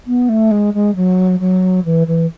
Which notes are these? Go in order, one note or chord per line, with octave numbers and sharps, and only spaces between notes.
B3
A3
G#3
G#3
F#3
F#3
E3
E3